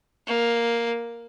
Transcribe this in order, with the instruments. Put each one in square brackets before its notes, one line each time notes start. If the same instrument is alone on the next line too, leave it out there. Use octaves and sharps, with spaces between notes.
[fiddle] A#3